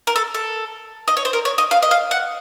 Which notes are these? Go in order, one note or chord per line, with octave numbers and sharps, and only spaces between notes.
A#4
A4
A4
D#5
C#5
C5
A#4
C#5
D#5
F5
D#5
F5
F#5